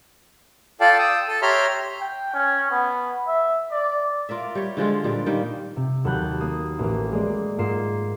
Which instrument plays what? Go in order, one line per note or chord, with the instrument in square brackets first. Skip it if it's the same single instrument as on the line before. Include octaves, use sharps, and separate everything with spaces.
[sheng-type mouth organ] F4 A4 D5 F5 G5 A5
G5 D#6 E6
A4 A5
G4 C#5 E5 A#5 C6 F6
[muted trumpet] G5
C#4
B3
E5
D5
[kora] F4 A#4 D5 E5
G3 C#5
D3 F3 G#3 F4
A#2 G3 D5
D#3 G3 A#3
[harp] C3
D#2 F#3 A5 B5 F#6 G6
A#3 D#6
A1 A#3
G#3 A#3 D5
G#2 A#3 F4 C7 E7